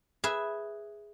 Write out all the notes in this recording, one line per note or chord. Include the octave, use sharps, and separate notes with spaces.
G#4 B4 E5